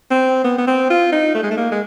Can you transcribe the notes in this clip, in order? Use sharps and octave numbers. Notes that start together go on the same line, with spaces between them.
C4
B3
B3
C4
F4
D#4
A3
G#3
A3
A#3
G#3